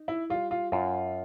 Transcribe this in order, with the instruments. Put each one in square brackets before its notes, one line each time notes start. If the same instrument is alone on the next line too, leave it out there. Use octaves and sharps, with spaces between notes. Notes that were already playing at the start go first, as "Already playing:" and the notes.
Already playing: [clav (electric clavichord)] D#4
[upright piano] E4
[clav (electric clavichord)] G3 [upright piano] F4
[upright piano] F4
[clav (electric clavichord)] F#2 [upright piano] F4